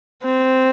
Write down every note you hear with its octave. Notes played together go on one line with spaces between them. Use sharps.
C4